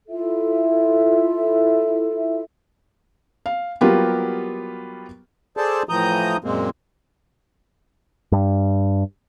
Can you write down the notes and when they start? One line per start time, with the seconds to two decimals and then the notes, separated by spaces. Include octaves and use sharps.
0.08 E4 F4 A4 E5
3.46 F5
3.81 F#3 G3 A#3 B3 F4 G4
5.57 G#4 A4 C5 D5 A5
5.89 A2 E3 F3 A#5 D#6 G6
6.44 F#2 A#2 G#3 A#3 C4
8.32 G2